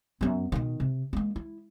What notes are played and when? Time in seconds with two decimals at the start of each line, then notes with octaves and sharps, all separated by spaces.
0.21 F#2 B3
0.52 B2 D#3
0.80 C3
1.13 G#3 A#3
1.36 E4